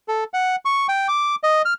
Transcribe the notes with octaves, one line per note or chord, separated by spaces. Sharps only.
A4
F#5
C#6
G5
D6
D#5
F6